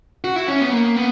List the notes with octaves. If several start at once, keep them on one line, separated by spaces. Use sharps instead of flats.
F#4
E4
C#4
B3
A#3
B3